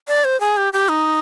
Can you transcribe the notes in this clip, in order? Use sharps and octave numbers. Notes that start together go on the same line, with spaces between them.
D5
C5
G#4
G4
G4
D#4